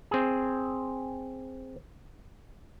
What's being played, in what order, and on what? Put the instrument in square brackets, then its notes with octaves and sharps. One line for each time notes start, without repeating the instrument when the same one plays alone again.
[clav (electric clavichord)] C4 G#4